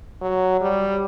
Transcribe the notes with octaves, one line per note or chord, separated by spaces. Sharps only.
F#3
G3